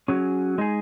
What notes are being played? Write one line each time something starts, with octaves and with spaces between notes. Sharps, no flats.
F#3 C#4 G#4
G#3 D#4 G#4